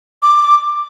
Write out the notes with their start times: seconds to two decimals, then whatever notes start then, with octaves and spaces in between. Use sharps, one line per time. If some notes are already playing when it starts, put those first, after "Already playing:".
0.22 D6